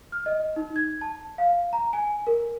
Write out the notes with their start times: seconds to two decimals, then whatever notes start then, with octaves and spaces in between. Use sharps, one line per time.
0.12 F6
0.26 D#5
0.56 D#4
0.76 G#6
1.01 A5
1.38 F5
1.73 A#5
1.93 G#5
2.27 A#4